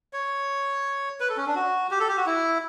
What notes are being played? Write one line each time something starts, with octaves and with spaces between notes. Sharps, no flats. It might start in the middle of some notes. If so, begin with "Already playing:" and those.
C#5
B4
A4
C#4
D4
F#4
G4
A4
G4
F#4
E4